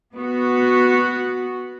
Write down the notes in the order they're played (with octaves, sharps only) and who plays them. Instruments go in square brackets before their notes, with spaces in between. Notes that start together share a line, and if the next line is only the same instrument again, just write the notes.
[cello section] B3 F#4